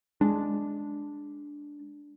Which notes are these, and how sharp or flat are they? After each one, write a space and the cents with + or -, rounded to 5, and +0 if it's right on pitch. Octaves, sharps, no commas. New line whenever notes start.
G#3 +0 D4 -5